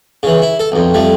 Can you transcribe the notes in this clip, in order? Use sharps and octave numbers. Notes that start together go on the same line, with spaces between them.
C#3 E3
E4
A4
B1 F2
F2 G3 A3